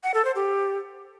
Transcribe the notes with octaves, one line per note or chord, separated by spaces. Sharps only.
F#5
A4
C5
G4